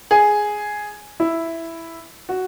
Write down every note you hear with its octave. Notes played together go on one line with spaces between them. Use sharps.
G#4
E4
F#4